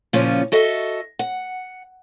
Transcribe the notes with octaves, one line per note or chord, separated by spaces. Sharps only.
A#2 C#3 F3 C#4 F4
F#4 A4 D#5 E5
F#5